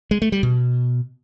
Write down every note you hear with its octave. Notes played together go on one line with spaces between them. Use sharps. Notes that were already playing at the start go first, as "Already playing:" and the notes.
G#3
A3
G3
B2